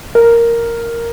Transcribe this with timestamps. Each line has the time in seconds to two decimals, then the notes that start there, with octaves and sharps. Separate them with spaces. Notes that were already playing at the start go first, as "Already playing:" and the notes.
0.15 A#4